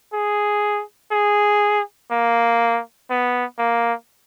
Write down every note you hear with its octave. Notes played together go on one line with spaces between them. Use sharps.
G#4
G#4
A#3
B3
A#3